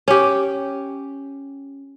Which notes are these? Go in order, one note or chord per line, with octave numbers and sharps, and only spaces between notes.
C#4 G4